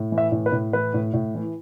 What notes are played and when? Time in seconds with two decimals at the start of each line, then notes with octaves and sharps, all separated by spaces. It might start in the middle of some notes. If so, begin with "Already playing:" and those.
Already playing: A2
0.12 E3
0.18 E5
0.32 A2
0.46 B4
0.52 A2
0.73 E3 B4
0.94 A2
1.14 A2
1.35 E3